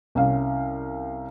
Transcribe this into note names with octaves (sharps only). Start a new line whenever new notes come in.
C2 C#4 F5